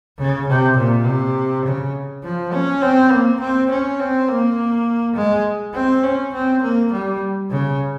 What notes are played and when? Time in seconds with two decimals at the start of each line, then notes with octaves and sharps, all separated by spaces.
0.19 C#3
0.48 C3
0.77 A#2
1.06 C3
1.65 C#3
2.24 F3
2.54 C#4
2.82 C4
3.12 A#3
3.40 C4
3.70 C#4
4.00 C4
4.28 A#3
5.16 G#3
5.74 C4
6.03 C#4
6.34 C4
6.62 A#3
6.92 G3
7.51 C#3